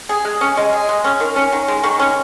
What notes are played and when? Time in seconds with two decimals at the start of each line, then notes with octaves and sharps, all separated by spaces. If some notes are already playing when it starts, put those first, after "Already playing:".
0.09 G#4
0.25 G#3
0.41 C#4
0.57 G#3 D#5
0.73 G#4
0.89 G#3
1.04 C#4
1.20 D#3 A#4
1.36 C#4
1.52 D#3
1.68 G#3
1.83 D#3 C#6
1.99 C#4